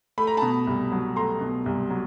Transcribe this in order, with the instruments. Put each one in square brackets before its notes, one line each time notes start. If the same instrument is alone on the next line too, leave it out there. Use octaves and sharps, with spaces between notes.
[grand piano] A3 B5
A#5
B2 A5 B5
C2
F#3
A3 A#5 C6
B2
C2
F#3